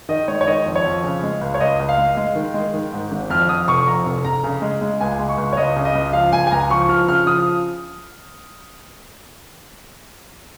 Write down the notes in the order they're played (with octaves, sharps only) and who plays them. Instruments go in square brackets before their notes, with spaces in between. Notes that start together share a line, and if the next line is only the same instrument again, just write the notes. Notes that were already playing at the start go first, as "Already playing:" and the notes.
[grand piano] D#3 D#5
G#3 C#5
C#5
D#3 D#5
F2
C#5
F2
C#3
G#3
C#2
C#5
C#2 D#5
C#2
F5
G#3
G#3
D#3
G#3
D#3
G#2
G#1
F2 F6
F2 D#6
F1 C#6
F2 A#5
F1
F1 A#5
C#3
G#3
G#3
C#2 G#5
G#3
C#6
C#2
C#5
C#2 D#5
C#3
D#5
C#2
F3 F5
C#2 G#5
G#5
C#2 A#5
F3 C#6
F3 F6
C#3 F6
F3 D#6